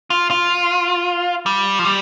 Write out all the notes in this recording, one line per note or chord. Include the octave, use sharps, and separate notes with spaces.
F4
F4
G3
F3
G3